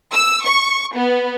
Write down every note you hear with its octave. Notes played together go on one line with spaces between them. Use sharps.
E6
C#6
B3